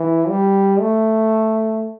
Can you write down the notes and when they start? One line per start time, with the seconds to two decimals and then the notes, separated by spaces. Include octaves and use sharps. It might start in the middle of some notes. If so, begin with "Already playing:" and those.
Already playing: E3
0.29 G3
0.80 A3